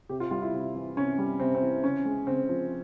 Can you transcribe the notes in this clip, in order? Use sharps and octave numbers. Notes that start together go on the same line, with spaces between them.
C3 G4
F4
G3 F4
E4
C3
E3
C3 C#4
G3
C3 C4
C4
E3
C#3 C#4
G#3
C#3 C4
F3